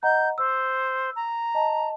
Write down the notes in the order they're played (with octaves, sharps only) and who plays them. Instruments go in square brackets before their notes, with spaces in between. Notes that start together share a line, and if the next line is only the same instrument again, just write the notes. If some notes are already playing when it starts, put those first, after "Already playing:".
[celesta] D#5 F#5 A#5 [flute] G6
[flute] C5 [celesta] E6
[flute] A#5
[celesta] D#5 A5